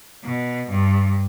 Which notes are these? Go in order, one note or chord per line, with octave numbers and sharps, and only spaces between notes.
B2
G2